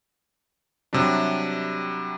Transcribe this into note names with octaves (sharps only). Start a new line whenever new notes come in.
C3 F#3 G3 D4